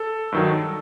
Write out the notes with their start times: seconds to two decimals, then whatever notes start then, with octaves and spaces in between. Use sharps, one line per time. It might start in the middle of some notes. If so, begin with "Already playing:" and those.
Already playing: A4
0.32 G2 D#3 F#3